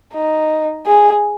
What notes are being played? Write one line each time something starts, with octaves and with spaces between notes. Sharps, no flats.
D#4
G#4